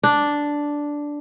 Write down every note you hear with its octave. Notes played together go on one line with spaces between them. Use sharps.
D4